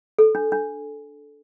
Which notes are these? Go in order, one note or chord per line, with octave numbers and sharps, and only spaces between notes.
A4
D4
D4